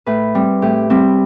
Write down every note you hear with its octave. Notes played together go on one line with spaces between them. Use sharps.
A2 B4
G3 C4
A2 G4
G3 C4